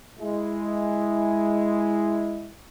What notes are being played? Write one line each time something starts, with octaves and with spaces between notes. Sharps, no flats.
G#3 E4